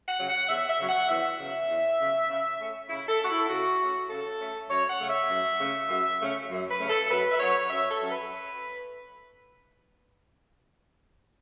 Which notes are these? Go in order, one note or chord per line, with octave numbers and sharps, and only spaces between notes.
F#5
C#3 F#3
F#5
E2 E5
E5
C#3 F#3
F#5
E2 E5
C#3 F#3
E2
C#3 F#3
C#3
A3 C#4
C#3 E4
A4
A3 C#4 F#4
E4
A4
C#3 F#4
A3 C#4
C#3 A4
A3 C#4
F#2 C#5
F#5
C#3 A3 C#4
E5
F#2
C#3 A3 C#4
F#2
C#3 A3 C#4
F#2
B4
C#3 A3 C#4
A4
F#2 B4
E5
F#3 C#4 C#5
F#2 E5
A4
F#3 C#4
B4